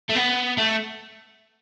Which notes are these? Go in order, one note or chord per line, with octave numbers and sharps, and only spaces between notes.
A3
B3
A3